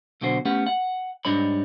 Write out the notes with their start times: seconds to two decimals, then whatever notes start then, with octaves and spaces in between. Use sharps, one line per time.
0.21 B1 B2 D3 F#4 C5
0.45 A3 B3 C#4 G4 F#5
0.67 F#5
1.25 G#2 G3 D4 D#4 C#5 B5